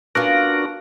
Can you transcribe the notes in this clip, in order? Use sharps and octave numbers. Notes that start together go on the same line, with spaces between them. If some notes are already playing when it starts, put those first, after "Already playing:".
B3 C#4 D4 F4 F#4 A#4